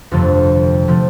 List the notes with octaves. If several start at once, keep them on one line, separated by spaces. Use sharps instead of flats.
G1 F2 C3 F3 A3
C3 F3 A3